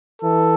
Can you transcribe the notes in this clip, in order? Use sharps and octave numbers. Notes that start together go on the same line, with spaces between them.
E3 A4